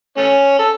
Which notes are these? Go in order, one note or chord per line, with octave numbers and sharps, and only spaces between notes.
A3 C#4
A4